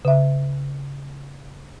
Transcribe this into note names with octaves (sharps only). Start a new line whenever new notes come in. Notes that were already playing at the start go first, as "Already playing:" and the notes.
C#3 E5